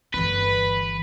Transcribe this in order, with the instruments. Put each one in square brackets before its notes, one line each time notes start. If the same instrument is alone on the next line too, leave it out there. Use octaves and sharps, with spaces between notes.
[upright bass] G1 E3 [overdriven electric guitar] B4